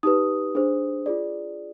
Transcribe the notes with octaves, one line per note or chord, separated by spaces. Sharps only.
D#4 G4 B4 D#6
D4 G#4 C5
F4 G#4 D5